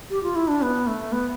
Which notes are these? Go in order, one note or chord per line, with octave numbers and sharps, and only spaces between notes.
G4
F4
E4
D4
B3
A3
B3